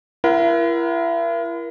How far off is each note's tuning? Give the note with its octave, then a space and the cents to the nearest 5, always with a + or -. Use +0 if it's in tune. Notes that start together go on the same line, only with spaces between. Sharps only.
E4 +40 A#4 +30 F#5 +0